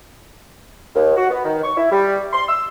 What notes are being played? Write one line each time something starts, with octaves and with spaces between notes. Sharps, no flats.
D#2
F#4
B3
D#3
C#6
E4
G3
C6
E6